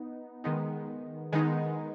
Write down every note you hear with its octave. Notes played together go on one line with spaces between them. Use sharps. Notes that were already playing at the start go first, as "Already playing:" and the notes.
Already playing: B3 D#4
D#3 G#3 B3 D#4
D#3 G#3 B3 D#4